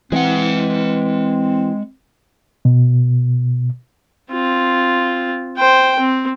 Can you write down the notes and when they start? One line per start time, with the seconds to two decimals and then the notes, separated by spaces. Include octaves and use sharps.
0.12 E3 G#3 C4 F#5
2.65 B2
4.31 C4 F4
5.57 C5 G5
6.00 C4